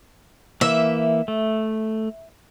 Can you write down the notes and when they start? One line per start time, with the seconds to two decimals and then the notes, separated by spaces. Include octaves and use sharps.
0.61 E3 A#3 E5
1.28 A3